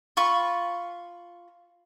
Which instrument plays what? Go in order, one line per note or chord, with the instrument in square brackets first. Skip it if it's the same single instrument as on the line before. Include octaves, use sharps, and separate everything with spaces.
[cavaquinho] F4 B5 C#6